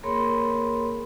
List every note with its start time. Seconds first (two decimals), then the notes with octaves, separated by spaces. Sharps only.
0.03 A#3 G#4 A#4 C#5 B5 C6